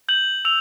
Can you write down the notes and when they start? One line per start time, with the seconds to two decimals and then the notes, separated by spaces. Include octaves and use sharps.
0.09 G6 F#7
0.45 E6 F7